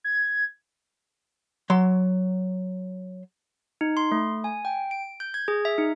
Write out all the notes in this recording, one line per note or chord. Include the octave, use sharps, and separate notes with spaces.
G#6
F#3 C6
D#4
C6
A3
G#5
G5
D7
G6
G#6
G#4
E5
D#4